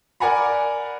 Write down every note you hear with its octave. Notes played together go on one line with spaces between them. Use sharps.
A#4 D5 F#5 G#5 A#5 B5